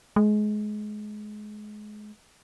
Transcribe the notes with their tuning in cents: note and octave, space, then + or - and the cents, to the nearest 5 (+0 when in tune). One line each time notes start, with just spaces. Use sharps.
G#3 +25